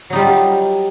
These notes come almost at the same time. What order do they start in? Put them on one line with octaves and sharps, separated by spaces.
F#3 D#4 G3 F4